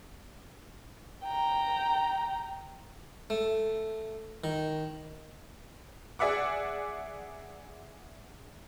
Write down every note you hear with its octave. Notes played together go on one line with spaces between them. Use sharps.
G5 A#5
A3
D#3
G#4 D5 E5 F#5 D6